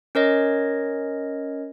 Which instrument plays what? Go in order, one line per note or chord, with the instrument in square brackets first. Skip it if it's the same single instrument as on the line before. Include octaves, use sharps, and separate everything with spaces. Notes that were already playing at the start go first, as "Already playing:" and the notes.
[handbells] C#4 A#4 C#5 D#5